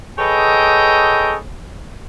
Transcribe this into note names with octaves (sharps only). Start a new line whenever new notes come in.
G#4 A4 B4 C#5 D#5 G5